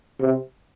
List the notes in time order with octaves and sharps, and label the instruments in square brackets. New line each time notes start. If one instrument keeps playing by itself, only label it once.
[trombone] C3